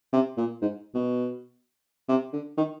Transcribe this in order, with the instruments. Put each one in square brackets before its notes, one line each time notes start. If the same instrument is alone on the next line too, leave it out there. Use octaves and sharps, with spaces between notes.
[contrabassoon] C3
A#2
G#2
B2
C3
D3
D#3